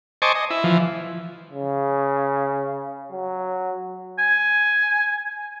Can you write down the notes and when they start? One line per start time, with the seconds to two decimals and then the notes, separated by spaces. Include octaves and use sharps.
0.22 C5 D#5 G#5 A5 C#6 D6
0.35 D#5
0.50 E4
0.64 E3 F3
1.51 C#3
3.12 F#3
4.18 G#5